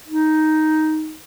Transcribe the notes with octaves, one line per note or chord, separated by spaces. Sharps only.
D#4